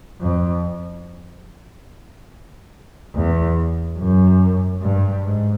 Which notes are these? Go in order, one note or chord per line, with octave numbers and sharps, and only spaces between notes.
F2
E2
F#2
G2
G#2